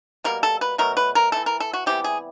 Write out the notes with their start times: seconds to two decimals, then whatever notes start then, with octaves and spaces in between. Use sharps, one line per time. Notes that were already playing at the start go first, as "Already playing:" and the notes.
0.24 B2 G3 A#3 A#4
0.43 A4
0.61 B4
0.78 B2 F#3 A3 A#4
0.97 B4
1.15 A#4
1.32 E3 A3 A4
1.46 A#4
1.60 A4
1.73 F#4
1.86 C3 E3 G3 B3 G4
2.04 G#4